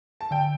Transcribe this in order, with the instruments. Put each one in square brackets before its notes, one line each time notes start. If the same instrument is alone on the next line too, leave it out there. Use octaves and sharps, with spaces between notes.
[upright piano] A5
[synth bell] D3 [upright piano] G5